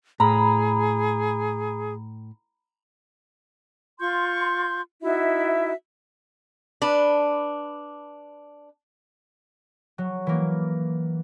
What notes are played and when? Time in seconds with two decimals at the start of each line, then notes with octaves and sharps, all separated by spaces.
0.20 A2 G#4 A#5 B5
3.99 F4 C6 C#6 G6
5.02 D#4 E4 F#4 E5
6.82 D4 B4
9.98 F#3
10.27 E3 A#3